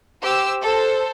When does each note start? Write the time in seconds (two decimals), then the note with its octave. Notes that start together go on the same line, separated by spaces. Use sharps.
0.22 G4 C5 E6
0.62 A4 C5